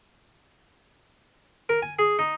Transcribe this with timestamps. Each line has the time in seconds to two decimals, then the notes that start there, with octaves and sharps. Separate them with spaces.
1.69 A#4
1.82 G#5
1.99 G#4
2.19 D#4